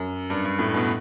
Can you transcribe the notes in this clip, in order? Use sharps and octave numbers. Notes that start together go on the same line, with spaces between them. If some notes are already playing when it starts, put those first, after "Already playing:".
Already playing: F#2
G2
G2
A2
B2